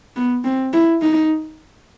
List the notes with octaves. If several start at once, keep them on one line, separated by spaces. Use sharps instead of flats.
B3
C4
E4
D#4